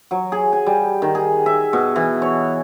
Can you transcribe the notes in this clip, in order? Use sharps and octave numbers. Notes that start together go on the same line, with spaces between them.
F#3
G#4
G#5
G3
D#3
G#4
E5
B2
E3
C#5